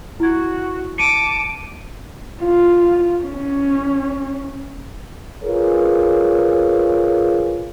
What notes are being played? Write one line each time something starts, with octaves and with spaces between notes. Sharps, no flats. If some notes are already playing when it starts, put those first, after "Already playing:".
E4 F#4 G#6
A5 D6 C#7 D#7
F4
C#4
F4 G#4 A#4 B4 C#5